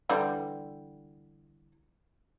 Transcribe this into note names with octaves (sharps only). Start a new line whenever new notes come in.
D3 E3 G3